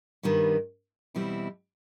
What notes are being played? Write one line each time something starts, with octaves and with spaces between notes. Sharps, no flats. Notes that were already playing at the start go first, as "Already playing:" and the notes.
G2 D#3 G3 B3
E2 B2 G3 C4 E4